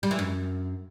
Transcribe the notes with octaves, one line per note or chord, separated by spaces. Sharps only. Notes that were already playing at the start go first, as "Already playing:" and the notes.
G3
E3
F#2